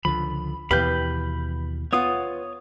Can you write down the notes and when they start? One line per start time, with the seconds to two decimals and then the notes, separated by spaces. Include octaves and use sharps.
0.05 C#2 D3 F3 B5
0.71 D#2 B2 E3 G4 B4 F5 B5 G6
1.93 B3 F4 C#5 D#6